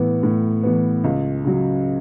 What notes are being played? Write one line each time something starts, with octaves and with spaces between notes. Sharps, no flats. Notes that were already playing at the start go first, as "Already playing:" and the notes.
Already playing: A2 E3 B3
A2
E3 B3
C#2
C#3 F#3